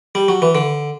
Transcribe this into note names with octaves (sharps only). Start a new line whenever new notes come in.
G3
F#3
E3
D3